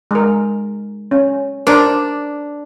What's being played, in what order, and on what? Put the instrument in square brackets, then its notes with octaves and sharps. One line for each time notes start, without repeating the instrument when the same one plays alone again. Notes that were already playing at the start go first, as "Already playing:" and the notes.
[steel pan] G#3 A#4
C#4
[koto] D4 [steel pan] A#4 C5 D5